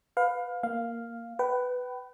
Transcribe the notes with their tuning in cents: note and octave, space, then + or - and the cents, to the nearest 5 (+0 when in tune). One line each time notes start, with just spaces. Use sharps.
B4 +15 F5 +25
A#3 -5 F5 +0
B4 +10 G5 -40